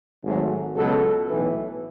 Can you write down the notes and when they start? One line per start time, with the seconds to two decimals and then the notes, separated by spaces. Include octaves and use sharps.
0.24 G#1 G#2 F#3 A3
0.76 C#2 B2 F#3 A4
1.28 B1 A2 E3 B4